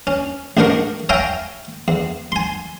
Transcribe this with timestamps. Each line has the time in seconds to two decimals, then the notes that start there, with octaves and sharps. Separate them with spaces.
0.07 C#4
0.57 A1 G#2 D4 D#4 A#4 C#6
1.09 C#5 E5 F5 G5 G#5 A#5
1.88 E2
2.32 G#5 C6